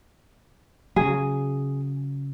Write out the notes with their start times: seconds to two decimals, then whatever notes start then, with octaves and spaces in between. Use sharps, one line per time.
0.96 C#3 F#3 G#4